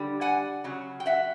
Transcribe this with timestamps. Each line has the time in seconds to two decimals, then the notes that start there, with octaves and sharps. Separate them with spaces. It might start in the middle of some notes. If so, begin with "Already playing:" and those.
Already playing: D3 G3
0.21 F#5 G#5
0.64 C#3 F#3
1.00 G5
1.06 E5 F#5